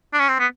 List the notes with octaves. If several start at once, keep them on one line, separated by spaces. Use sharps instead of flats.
D4
C#4
C4
B3